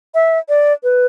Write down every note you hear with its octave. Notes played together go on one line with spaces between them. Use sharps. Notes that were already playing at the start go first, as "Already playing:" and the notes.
E5
D5
B4